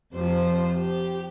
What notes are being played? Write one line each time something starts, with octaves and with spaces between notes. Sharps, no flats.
F2 C3 F3 C5
G4